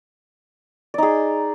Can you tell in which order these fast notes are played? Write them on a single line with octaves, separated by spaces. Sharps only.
D5 D#4 G#4